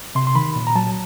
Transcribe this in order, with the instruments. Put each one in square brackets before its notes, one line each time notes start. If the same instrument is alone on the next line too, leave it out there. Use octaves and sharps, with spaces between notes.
[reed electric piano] C3 C6
C6
D#3 B5
A#2
A#5
F#3 A5